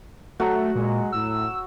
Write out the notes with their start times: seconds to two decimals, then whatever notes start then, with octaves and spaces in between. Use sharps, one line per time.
0.40 F#3 A3 F#4
0.75 A#2 G#3
1.12 A2 E6